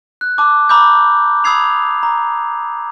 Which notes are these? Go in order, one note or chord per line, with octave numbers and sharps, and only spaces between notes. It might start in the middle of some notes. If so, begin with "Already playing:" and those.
F#6
A5 D6 F#6
A#5 B5 D6 E6 G6
B5 D#6 E6 G#6 C7 F7
A#5